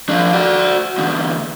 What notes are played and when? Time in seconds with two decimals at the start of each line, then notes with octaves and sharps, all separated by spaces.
0.09 F3 D4
0.33 F#4 D5
0.98 E2 D3